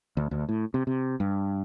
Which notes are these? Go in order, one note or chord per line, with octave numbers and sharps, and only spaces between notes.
D2
D2
A2
C3
C3
G2